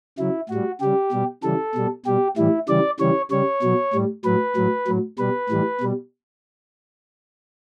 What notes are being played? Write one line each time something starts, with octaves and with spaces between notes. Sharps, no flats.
C#3 F#3 E4
A2 G3 F#4
C#3 G3 G4
B2 G3
C#3 E3 G3 A4
B2 G3
B2 G3 G4
A2 E3 G3 E4
C#3 E3 G3 D5
C#3 E3 G3 C#5
C#3 G3 C#5
B2 F#3
A2 G3
A2 F#3 B4
A2 F#3
A2 F#3
B2 G3 B4
A2 E3 G3
B2 G3